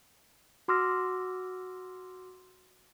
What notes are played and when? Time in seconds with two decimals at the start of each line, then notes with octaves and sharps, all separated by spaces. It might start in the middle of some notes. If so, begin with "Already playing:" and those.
0.68 F#4 C6 D6 E6 F6 A#6